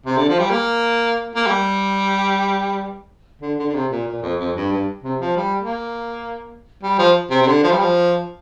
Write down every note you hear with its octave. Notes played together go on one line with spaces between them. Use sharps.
C3
D3
F3
G3
A#3
A#3
G3
D3
D3
D3
C3
A#2
A#2
F2
F2
G2
G2
C3
F3
G3
A#3
G3
F3
C3
C3
D3
F3
G3
F3